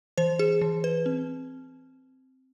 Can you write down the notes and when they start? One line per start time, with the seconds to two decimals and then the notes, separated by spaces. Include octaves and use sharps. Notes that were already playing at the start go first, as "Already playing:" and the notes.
0.18 E3 C5
0.39 G#4
0.62 E3
0.84 B4
1.06 C4